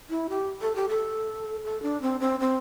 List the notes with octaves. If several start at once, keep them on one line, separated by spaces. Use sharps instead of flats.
E4
G4
A4
G4
A4
A4
D4
C4
C4
C4